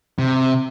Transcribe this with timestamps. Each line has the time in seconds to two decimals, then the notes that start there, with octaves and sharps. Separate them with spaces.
0.19 C3